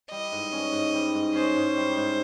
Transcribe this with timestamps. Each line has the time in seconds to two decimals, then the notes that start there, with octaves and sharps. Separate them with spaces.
0.11 G3 D#5
0.32 G#2
0.52 C#4
0.72 G#2
0.94 G3
1.15 G#2
1.35 C#4 C5
1.56 G#2
1.77 G3
1.97 G#2